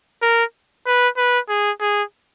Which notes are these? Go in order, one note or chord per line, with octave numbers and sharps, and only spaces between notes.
A#4
B4
B4
G#4
G#4